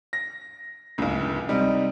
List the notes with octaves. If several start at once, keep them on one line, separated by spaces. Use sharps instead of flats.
A#6
D1 C#2
C3 G3 D#4